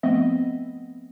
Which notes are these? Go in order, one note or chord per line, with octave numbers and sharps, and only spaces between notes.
F3 A3 B3 C4 D#5 E5